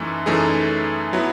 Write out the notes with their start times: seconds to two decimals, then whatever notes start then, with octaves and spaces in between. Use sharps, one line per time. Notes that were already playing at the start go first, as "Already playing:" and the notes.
Already playing: F#2 E3 A3 D#4
0.26 F#2 E3 A3 D#4 G#4
1.13 F#3 B3 E4